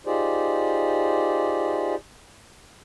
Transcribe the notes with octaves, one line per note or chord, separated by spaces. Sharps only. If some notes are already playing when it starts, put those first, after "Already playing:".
D#4 F4 G4 G#4 C5 D5